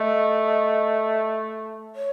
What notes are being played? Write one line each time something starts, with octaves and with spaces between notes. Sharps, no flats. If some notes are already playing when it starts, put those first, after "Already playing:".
Already playing: A3 D#5
C#5